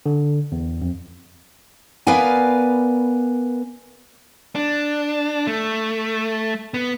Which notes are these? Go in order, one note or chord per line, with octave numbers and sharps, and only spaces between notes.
D3
E2
F2
B3 A#4 B4 D5 F5 G#5
D4
A3
B3